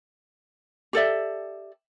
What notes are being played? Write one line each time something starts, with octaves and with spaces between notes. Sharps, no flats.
G4 A4 D5 E5